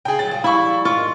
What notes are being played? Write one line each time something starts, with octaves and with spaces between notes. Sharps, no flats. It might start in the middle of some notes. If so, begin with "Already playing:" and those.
C#3 G#4 G5
F#3 C#4 A6
F3 G3
E4 B5 C#6
G#2 D#3 F4 C#6